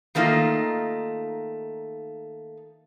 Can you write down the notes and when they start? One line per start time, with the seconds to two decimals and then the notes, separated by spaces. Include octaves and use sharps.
0.15 D#3 A3 A#3 D#4 F4